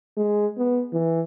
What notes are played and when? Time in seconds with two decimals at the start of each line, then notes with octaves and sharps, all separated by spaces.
0.17 G#3
0.58 B3
0.93 E3